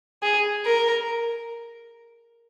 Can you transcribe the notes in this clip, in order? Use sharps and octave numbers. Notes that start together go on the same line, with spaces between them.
G#4
A#4